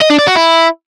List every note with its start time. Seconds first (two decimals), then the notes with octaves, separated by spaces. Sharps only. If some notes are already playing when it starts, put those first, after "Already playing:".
0.02 D#5
0.10 D4
0.19 D5
0.27 F#4
0.35 E4